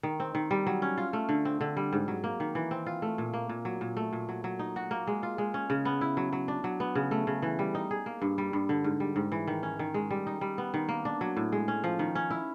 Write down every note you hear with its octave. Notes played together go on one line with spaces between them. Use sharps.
D#3
C4
D#3
G3
F#3
C#4
F4
A3
D3
C4
D3
G3
G#2
F#3
A#3
D#3
E3
C4
F4
A3
A#2
A#3
A#2
F#3
A#2
A3
A#2
F#3
F#3
D#4
F#4
A#3
G#3
F4
G#3
C#4
C#3
B3
E4
F#3
F#3
D4
F#3
B3
C#3
A3
C#3
E3
G3
D#4
G#4
A#3
G2
G3
G2
D3
G#2
G3
G#2
E3
D#3
C#4
D#3
G#3
G3
D#4
G3
B3
D#3
A#3
D4
F#3
A2
G#3
C#4
F3
D#3
C#4
E4